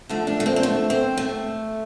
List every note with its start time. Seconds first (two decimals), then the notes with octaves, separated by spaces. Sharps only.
0.09 D3 F3 A3
0.27 D4
0.40 A3
0.46 C4
0.56 C4
0.63 A3
0.90 C4
1.18 A3